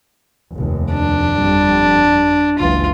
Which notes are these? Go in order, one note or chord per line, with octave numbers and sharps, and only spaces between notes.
F1 D#2
D4
G1 F2 G3
F#1 C#2 E3 F4